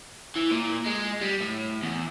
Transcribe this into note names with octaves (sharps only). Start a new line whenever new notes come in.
E3
A#2
G#3
G3
A2
E2